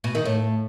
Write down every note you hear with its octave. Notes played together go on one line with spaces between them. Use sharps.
B2
D#3
A2